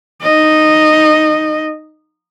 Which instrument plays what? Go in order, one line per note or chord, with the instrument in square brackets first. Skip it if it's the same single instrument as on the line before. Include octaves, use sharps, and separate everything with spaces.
[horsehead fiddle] D#4 D#5